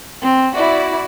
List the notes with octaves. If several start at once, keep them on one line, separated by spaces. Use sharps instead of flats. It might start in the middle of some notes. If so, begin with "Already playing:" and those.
C4
E4 F#4 D5